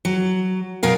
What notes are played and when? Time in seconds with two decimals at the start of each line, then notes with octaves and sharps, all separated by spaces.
0.05 F#3
0.83 B2 F#3 A#4 F5